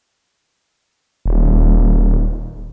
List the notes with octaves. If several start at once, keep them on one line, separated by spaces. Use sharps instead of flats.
D#1